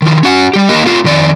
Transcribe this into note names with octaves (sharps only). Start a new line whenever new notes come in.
D#3 F3 F4
C#4 F#4 F#5
G3 G4
A#3 G4 A#4 D#5
A3 F4
F2 D#3 D5